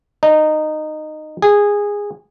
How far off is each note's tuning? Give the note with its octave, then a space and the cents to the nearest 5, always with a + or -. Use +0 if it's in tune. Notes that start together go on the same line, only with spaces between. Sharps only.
D#4 -15
G#4 -15